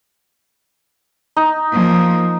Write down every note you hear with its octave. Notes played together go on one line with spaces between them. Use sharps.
D#4
F3 A#3